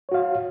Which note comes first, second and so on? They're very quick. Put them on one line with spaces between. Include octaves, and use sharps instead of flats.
C#5 F#4 F5